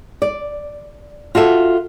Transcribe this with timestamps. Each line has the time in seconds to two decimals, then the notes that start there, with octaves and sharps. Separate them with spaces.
0.22 D5
1.35 F4 F#4 A4 E5